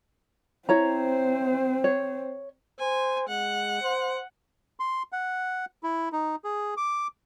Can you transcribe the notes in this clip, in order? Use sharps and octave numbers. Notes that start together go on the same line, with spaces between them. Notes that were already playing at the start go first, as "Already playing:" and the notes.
C4 E4 C5 C#5 A#5
C#5
C5 G#5
G#3 F#5
C5
C6
F#5
E4
D#4
G#4
D6